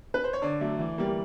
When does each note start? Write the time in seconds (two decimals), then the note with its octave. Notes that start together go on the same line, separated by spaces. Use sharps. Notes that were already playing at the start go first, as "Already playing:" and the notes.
0.14 B4
0.24 C5
0.33 C#5
0.42 D3 D5
0.61 F#3 A3
0.79 E3
0.98 G3 A#3